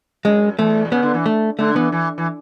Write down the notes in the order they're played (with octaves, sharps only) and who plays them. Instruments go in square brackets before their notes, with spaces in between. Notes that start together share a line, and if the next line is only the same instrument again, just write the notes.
[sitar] F#2 [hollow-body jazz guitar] G#3
[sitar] E2 [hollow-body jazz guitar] A3
[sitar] B2
[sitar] C#3 [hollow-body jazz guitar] B3
[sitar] D3
E3
[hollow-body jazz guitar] A3
[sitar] D3 [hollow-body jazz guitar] A3
[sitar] E3 [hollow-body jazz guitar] B3
[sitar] E3
E3